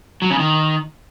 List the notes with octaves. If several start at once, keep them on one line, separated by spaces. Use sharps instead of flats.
F#3
C#3
D#3